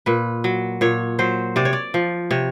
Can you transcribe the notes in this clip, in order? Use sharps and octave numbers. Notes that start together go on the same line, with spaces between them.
A#2 B4
F#3
A#2 C#5
F#3 C5
C3 D5
C#5
D5
F3
C3 C#5